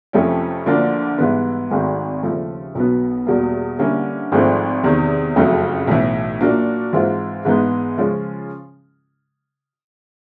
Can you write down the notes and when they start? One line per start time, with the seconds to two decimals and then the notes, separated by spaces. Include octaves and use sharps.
0.13 F2 C3 F3 A3 C#4
0.66 D2 D3 F3 A#3 D4
1.18 G#2 E3 G3 B3
1.70 G#1 G#2 D#3 F#3 A3
2.23 D#2 C#3 F3 A3
2.75 B1 B2 F#3 B3
3.27 E2 B2 G3 A#3
3.79 D3 G3 A#3 C#4 E4
4.32 G#1 G#2 F3 A3 C4
4.84 E2 C3 D#3
5.36 F#1 F2 C#3 F#3 A3
5.87 B1 A2 E3
6.41 A#2 F#3 A#3 D4 F#4
6.93 G#2 E3 G#3 C4 F4
7.45 G#2 E3 G#3 B3 D#4
7.97 C#3 F3 G#3 C#4 F4